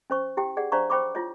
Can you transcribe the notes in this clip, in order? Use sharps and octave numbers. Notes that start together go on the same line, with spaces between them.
C#4 C5 C#6
E4 G4 G5
G#4 D5 F#5
D4 C5 D5 F5 A#5 C#6
C5 G5 B5 C#6 D6
E4 F4 C#5